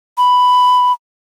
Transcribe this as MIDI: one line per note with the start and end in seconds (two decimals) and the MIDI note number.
0.18 0.92 83